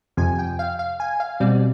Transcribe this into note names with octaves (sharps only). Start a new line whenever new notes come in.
F2 C3 F3 G#5
G5
F5
F5
G#5
F5
B2 G3 C4 D5